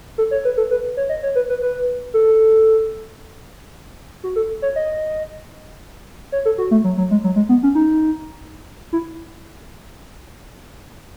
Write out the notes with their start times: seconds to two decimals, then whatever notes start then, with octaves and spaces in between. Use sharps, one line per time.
0.18 A4
0.31 C#5
0.45 B4
0.57 A4
0.71 B4
0.97 C#5
1.09 D#5
1.23 C#5
1.35 B4
1.49 B4
1.62 B4
2.14 A4
4.24 F#4
4.36 A4
4.62 C#5
4.76 D#5
6.32 C#5
6.45 A4
6.58 F#4
6.71 A3
6.84 F#3
6.98 F#3
7.11 G#3
7.24 F#3
7.36 G#3
7.49 B3
7.63 C#4
7.75 D#4
8.93 E4